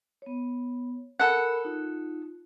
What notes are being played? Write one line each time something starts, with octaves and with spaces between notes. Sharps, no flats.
B3 C#5
A4 A#4 F#5 B5
D#4 F4